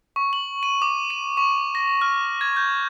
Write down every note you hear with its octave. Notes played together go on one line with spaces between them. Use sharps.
C#6
F#7
D#7
D6
D#7
C#6
A#6
F6
G#6
G6